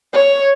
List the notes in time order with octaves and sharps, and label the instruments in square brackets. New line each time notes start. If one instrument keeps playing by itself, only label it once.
[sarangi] C#5